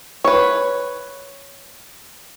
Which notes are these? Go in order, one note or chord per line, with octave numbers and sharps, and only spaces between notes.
B4 C#5